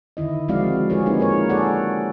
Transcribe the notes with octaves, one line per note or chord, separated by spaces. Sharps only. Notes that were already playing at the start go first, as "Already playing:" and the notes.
D3 D#3 E4 D#5
F3 G#3 C4 F#4 D5 F5
C4 F4 G4 G#4 B4 C#5
A#3 D#4 G#4 B4
D#4 A#4 C#5
G#4 A4 C#5 D5 F#5